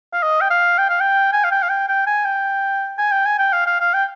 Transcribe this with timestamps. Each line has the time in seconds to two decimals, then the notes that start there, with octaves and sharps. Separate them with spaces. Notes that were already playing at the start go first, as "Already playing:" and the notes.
0.13 F5
0.23 D#5
0.41 G5
0.50 F5
0.78 G5
0.90 F5
1.01 G5
1.33 G#5
1.44 F5
1.51 G5
1.62 F5
1.69 G5
1.88 G5
2.07 G#5
2.25 G5
2.98 G#5
3.11 G5
3.26 G#5
3.39 G5
3.53 F5
3.67 F5
3.81 F5
3.94 G5